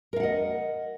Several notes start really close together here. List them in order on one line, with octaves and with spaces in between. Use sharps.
A#4 F5 F#5 D#5